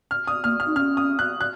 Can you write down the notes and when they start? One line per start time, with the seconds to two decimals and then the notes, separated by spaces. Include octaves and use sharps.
0.11 F6
0.27 D#6
0.44 A#3 F6
0.60 F6
0.67 D#4
0.76 C#4 F6
0.97 D#6
1.19 F#6
1.41 F#6